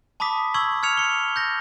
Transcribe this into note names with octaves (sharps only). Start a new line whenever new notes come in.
A5 B5 D6 D#6 B6
C#6 E6 G#6 F#7
F6 G#6 C#7 F7
C#7 G7
G6 A#6